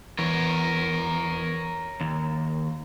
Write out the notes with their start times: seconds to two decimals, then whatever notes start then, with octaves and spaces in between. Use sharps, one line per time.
0.19 E2 A#4 C#5
2.01 D#2